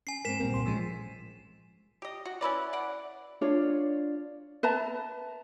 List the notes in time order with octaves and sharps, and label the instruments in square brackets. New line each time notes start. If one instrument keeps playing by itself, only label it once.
[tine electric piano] C#4 [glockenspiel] G#5 C7
[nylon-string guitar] G#2 C4 [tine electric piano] A#4 [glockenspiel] B6 E7
[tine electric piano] A#1 A#2 [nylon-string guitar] G3 A#3 C4
[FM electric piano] C#2 C6
[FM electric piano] A2 F3 G#3 [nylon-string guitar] C#4
[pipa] G4 D#5
F#4
C#4 E4 B4 D5
D5 F#5
[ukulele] D4 F4 C#5 D5
B4 E5 A5 A#5